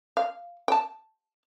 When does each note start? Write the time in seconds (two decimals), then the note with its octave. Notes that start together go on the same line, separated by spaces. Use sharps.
0.17 F5
0.68 G5 A5